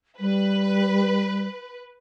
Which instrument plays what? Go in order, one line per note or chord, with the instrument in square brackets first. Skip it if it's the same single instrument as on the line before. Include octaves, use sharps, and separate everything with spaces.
[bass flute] G3 [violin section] B4